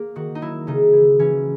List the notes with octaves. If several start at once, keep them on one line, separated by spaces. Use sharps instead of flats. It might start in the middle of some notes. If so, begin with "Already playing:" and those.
Already playing: A#3 G#4
D#3 F#4
D#4
F#3 E4
C#3 D#4
E3
E3 C#4